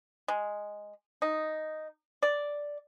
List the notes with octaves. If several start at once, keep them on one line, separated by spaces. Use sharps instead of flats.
G#3
D#4
D5